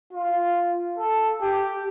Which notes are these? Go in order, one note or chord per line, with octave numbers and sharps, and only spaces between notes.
F4
A4
G4